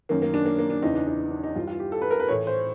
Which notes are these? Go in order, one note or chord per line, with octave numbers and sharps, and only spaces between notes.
F#2 D#3 A#3
A#3
D4
A#3
A#3
D4
E2 C#3 E3 D#4
D4
D#4
D4
D#4
G2 E3 F4
F4
G4
A4
B4
A#4
B4
A2 E3 C#5
C5